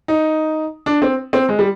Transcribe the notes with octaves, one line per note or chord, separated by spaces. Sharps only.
D#4
D4
C4
C4
G#3
G3